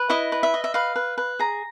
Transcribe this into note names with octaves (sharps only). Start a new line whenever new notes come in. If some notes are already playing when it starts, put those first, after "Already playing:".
Already playing: B4
E4 D#5
B4
E5
D#5
E5
B4 F5
B4
B4
G#4 A#5